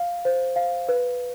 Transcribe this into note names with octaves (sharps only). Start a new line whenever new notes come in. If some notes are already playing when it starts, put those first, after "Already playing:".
Already playing: F5
C5
F5
B4